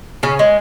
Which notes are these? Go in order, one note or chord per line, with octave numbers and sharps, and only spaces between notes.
C#3 C#4
G#3